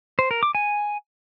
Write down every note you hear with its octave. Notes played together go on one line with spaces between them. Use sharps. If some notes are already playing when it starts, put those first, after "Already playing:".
C5
A#4
D6
G#5